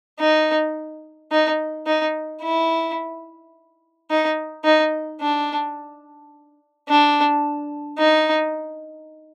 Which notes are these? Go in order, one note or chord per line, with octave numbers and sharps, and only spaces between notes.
D#4
D#4
D#4
E4
D#4
D#4
D4
D4
D#4